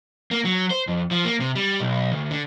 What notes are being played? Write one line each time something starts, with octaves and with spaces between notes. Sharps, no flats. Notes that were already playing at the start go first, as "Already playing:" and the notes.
A#3
F#3
C5
F2
F3
A#3
C3
G3
B1
D2
D3